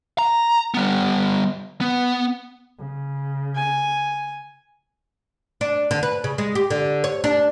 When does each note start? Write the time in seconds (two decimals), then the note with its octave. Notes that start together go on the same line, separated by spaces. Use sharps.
0.18 A#5
0.74 G3 B3
1.81 B3
2.78 C#3
3.55 G#5
5.61 D4
5.91 D3
6.03 B4
6.24 C#3
6.38 G#3
6.55 G4
6.70 D3
7.04 C#5
7.24 D4